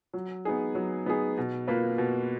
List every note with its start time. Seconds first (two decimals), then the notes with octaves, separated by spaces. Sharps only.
0.14 F#3
0.45 B3 D#4 G#4
0.75 F#3
1.06 B3 D#4 G#4
1.38 B2
1.68 A#3 F4 B4
1.98 B2